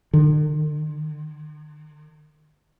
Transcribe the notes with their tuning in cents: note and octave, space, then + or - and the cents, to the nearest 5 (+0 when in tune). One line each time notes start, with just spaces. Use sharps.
D#3 -45